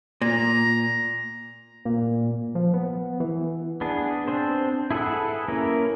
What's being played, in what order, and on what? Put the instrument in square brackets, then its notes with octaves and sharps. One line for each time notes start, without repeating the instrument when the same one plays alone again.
[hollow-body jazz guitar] A#2 [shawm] A#5
[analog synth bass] A#2
F3
B3
E3
[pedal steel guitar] B3 D4 G#4
C4 D4 C5
E4 G#4 A4 B4 F#5
A#3 C#4 E4 A#4